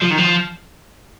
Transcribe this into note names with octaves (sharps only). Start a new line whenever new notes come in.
F3
D#3
F3